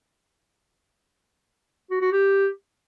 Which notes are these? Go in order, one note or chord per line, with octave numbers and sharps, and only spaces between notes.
F#4
F#4
G4